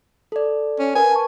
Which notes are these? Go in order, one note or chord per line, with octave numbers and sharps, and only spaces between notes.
A4 D5
C#4
A#4 B4 G#5
A5 C#6